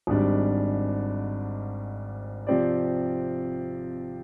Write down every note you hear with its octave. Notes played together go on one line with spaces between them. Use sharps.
G#1 G#2 G3 D4
C3 F3 C4 G4 D5